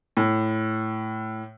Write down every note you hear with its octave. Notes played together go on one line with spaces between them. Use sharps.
A2